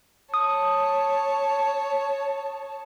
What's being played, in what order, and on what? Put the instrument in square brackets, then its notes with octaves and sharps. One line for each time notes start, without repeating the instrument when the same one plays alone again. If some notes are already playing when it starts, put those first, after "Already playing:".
[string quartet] C#5 A5 [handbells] D#6